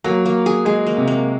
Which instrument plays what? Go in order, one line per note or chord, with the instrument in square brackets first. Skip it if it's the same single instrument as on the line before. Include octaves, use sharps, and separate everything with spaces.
[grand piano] F#3 [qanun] A#3
[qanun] A#3
G#4
[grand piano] G#3 [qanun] G#4
[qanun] A#3
[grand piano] C3
[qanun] A#3